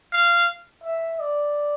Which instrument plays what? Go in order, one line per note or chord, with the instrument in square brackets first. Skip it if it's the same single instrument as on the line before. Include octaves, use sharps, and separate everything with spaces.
[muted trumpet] F5
[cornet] E5
D5